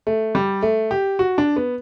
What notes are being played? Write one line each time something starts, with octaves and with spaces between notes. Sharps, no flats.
A3
G3
A3
G4
F#4
D4
B3